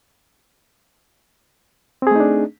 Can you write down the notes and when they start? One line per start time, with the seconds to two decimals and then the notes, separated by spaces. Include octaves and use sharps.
2.02 C4
2.07 G#4
2.11 A3
2.16 D#4
2.20 D4